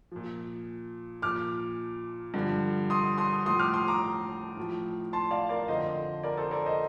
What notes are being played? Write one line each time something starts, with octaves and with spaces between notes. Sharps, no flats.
A#2 F3
A#2 F3 D6 F6
G2 D3 F3
C6 D#6
C6 D#6
A2 F3 C6 D#6
D6 F6
C6 D#6
A#5 D6
A2 F3
A5 C6
D5 F5
A#4 D5
F2 D3 F3 C5 D#5
A#4 D5
A4 C5
A#4 D5
C5 D#5